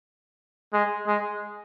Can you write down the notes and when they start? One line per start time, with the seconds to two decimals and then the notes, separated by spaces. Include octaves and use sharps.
0.73 G#3
1.07 G#3